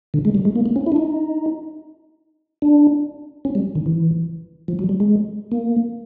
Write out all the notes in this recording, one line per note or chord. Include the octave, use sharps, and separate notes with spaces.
D3
G#3
G3
G#3
A#3
A#3
C#4
E4
D4
D#4
D4
C#4
G3
D#3
E3
F3
F#3
G3
G#3
A#3